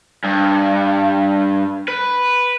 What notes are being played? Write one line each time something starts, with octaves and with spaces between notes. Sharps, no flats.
G2
B4